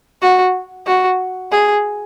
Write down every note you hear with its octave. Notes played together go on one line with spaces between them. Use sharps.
F#4
F#4
G#4